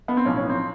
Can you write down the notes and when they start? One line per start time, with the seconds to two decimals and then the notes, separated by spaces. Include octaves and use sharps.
0.08 B3
0.17 C4
0.25 B1 A2 F3 C#4
0.37 C#4
0.49 C4